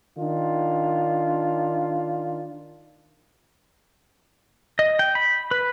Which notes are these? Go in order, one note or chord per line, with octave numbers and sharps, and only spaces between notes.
D#3 D4 F4
D#5
G5
B5
B4